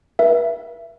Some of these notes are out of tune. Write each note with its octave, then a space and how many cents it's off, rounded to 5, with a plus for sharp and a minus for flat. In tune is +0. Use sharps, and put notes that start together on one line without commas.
B4 -40 E5 +20